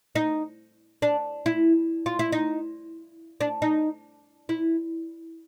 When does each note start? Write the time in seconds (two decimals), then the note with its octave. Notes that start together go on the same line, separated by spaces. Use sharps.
0.15 D#4
1.02 D4
1.46 E4
2.06 F4
2.19 E4
2.32 D#4
3.40 D4
3.62 D#4
4.49 E4